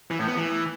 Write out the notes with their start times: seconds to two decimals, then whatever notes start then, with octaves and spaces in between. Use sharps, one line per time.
0.11 E3
0.19 A2
0.28 B3
0.36 E3